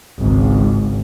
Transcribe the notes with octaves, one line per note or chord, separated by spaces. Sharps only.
G#1 C#2